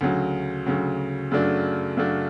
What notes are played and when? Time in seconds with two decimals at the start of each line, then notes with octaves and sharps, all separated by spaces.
0.01 D2 C#3 F#3
0.66 D2 C#3 F#3
1.31 F#2 C#3 F#3 A3 D4
1.97 F#2 C#3 F#3 A3 D4